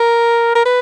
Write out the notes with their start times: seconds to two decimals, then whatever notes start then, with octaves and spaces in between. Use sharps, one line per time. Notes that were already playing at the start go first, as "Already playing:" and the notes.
Already playing: A#4
0.55 A#4
0.65 B4